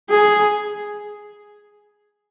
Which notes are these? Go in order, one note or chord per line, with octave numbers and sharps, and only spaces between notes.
G#4